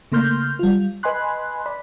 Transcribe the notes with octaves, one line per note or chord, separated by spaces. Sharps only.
C#3 A3 A#3 C6 F6 G6
G3 F4
B4 D#5 G#5 B5 C6 F#6
D5 B5